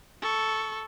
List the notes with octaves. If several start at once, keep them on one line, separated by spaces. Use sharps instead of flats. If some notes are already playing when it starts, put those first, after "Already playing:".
A4 C#6